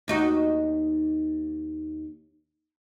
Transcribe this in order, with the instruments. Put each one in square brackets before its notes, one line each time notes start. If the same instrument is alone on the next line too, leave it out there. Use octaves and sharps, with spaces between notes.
[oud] D#2 D#4 F#4